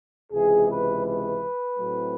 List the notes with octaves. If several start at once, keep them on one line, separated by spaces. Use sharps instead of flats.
C#2 C3 E3 G#3 G#4
B4
B4
A2 F#3 A3 C4